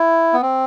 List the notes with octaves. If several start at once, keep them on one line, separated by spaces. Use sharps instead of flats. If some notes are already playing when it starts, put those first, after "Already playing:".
Already playing: E4
B3
C4